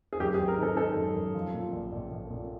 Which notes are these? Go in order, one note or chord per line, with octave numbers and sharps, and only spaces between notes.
G#4
F#2 G4
G#4
G#1
A#4
D#3 A4
D#3 A4
F#2
F#2
F3
A#2
A#1
A#1
A#1
A#2